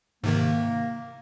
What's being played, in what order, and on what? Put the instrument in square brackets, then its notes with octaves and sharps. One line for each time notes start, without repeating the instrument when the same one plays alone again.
[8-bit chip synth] G#2 C3 D#3 [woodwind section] A#3